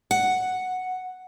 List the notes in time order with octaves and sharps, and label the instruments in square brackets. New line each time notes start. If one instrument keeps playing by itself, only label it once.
[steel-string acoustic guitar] F#5